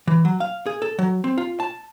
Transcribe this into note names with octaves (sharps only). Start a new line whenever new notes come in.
E3
F#3
F5
G#4
A4
F#3
C4
F4
A5